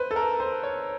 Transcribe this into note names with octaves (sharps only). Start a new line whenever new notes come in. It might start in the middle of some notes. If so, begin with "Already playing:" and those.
Already playing: B4 C5
A4
A#4
C5
C#5